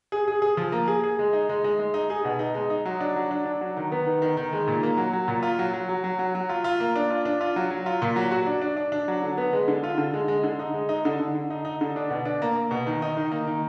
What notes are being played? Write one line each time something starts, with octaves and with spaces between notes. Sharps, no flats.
G#4
G#4
G#4
F3
A#3
G#4
G#4
G#3
D#4
G#3
G#3
G#3
D#4
G#4
B2
D#4
G#3
D#4
F#3
D4
F#3
D4
D4
F#3
D#3
B3
D#3
D#3
D#3
G#3
A#2
A#3
F#3
F#3
A#2
F4
F#3
F#3
F#3
F#3
F#3
F#3
F4
F4
A#3
D4
F4
D4
F4
F#3
F#3
F4
A#2
F#3
F#4
D4
D4
D4
D4
F#3
D3
B3
G#3
D3
F4
D3
G#3
G#3
D3
D#4
G#3
D#4
D3
D3
D3
D#4
D#4
D3
D4
B2
D4
A#3
A#3
B2
D#3
D#4
D#3
A#3
D#3